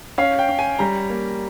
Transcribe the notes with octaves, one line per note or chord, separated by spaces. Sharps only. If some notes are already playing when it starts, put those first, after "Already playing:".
C#4 F5
G5
C#4
G#5
G3 A#5
A#3